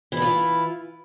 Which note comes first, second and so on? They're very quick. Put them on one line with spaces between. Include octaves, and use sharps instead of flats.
E3 E4 F4